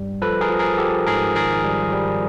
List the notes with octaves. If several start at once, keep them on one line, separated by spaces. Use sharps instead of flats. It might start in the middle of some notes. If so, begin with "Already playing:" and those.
Already playing: G2 G3
F3 A4 B4
G#4 A#4
F3
G#4 A#4
F3 G4 A4
G#2 G#4 A#4
D#3 G#4 A#4
G3
G3